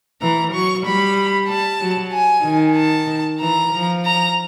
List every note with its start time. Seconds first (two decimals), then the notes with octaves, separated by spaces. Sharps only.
0.22 E3 A#5
0.53 F#3 C#6
0.86 G3 B5
1.49 A5
1.81 F#3
2.13 G#5
2.45 D#3
2.77 A5
3.41 E3 A#5
3.73 F3
4.05 A#5